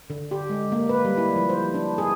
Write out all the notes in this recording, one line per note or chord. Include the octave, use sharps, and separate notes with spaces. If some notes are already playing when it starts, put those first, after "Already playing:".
D3
G4
G#3
A#3
B4
G3
E4
F3
C5
D4
G#4